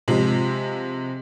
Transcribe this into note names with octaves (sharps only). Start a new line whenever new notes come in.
C3 F3 G#3